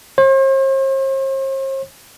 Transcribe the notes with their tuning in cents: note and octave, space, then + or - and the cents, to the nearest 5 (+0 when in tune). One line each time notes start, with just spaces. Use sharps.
C5 +45